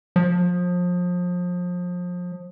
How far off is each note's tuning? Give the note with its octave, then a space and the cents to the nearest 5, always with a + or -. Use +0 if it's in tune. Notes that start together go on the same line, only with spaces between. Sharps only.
F3 +30